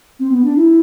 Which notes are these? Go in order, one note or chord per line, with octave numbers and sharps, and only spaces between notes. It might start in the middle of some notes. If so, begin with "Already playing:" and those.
C4
B3
D4
E4